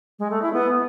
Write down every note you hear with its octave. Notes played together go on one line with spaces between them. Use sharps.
G#3
A3
E4
B3